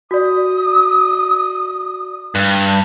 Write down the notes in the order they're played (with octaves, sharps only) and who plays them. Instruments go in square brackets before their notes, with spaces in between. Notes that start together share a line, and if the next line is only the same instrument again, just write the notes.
[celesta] F#4 D5 [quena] D#6
[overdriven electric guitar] G2